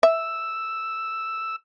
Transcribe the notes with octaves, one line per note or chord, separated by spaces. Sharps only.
E5 E6